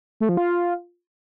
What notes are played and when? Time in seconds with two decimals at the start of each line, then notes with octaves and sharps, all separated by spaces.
0.20 A3
0.29 F3
0.37 F4